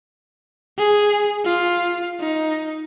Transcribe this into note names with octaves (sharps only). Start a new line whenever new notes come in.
G#4
F4
D#4